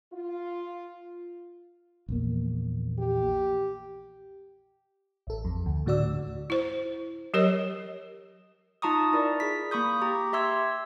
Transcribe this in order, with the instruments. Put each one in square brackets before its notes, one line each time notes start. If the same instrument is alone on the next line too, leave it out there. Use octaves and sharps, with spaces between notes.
[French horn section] F4
[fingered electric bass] A#1 E2 A#3
[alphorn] G4
[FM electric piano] A1 A4
F2
D2
A2 D3 F#4 D5 E6
[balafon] E4 C5
F#3 G4 A#4 C#5 D#5
[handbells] D#4 F4 A5 A#5 C#6 D#6
E4 A#4 D5
G#4 B6
A#3 B5 C#6 D#6 G6
G4 A#5
G4 E5 C6 E6 G#6